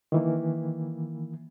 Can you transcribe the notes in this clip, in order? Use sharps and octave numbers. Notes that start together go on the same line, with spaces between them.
D#3 E3 A#3